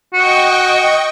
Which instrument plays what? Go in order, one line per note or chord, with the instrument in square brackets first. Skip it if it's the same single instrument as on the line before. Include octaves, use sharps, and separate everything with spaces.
[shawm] F#4 [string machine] D#5 G5 C#6